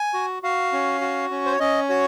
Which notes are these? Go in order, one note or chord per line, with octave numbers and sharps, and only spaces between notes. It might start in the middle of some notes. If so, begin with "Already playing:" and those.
Already playing: G#5
F#4
F#4 F5
C#4
F#4
C#4
C5
C#5
C#4 D#5
F#4 C#5